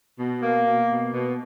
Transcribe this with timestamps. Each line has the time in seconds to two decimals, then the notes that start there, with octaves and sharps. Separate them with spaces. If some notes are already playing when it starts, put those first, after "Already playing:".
0.19 B2
0.42 A#3
0.66 B2
0.90 B2
1.14 B2